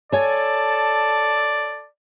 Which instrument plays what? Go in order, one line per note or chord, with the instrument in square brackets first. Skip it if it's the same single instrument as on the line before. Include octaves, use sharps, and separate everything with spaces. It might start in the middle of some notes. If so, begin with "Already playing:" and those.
[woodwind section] A4 A5 [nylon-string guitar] C#5 G#5 [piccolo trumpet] D5